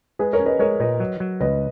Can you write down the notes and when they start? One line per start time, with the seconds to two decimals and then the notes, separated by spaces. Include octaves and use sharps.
0.19 G#3 G#4 B4
0.33 A#4 C#5
0.39 C#4
0.46 B4 D#5
0.59 G#3 A#4 C#5
0.80 A#2 B4 D#5
1.00 F#3
1.20 F#3
1.40 C#2 B4 D#5